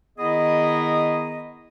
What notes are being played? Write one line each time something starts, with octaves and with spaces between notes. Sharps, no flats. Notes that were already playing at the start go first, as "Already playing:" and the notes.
D#3 B3 E4 G#4 D#5